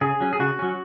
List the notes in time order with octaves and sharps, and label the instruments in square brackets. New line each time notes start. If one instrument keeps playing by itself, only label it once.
[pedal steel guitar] C#3 G#4
F#3 C#4
G#4
C#3 F#4
F#3 C#4